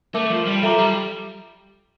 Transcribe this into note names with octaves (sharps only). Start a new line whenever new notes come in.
A3 A#4 E5 A5 D6
F3
G3
F3 A4 E5 A#5 D6
G3